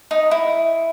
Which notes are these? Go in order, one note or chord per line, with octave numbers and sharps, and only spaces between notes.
D#4
E4